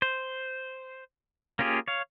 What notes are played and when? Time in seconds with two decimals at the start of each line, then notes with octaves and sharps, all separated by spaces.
0.02 C5
1.59 A#3 C#4 F4 G4 G#4
1.88 C#5 F5